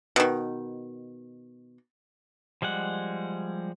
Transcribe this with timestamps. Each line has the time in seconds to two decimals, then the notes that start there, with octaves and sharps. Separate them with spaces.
0.16 B2 D#3
2.62 F3 G3 G#3 F#5